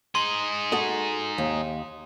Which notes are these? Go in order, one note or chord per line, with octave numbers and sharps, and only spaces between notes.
D#4 G#4 C6
F#4 A4 D#5
D#2